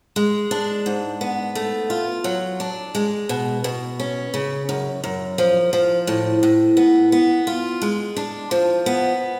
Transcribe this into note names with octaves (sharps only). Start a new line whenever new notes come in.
G#3
D4
G#2
B3
A3
F4
F#3
D4
G#3
B2
B2
C#4
C#3
F#2
F#2
F3
F3
A2
A2
B3
B3
F4
G#3
D4
F3
B3